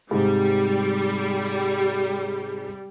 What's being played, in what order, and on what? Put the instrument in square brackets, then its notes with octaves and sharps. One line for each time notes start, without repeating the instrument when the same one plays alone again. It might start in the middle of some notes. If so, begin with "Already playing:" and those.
[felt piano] G#2 C3 [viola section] G3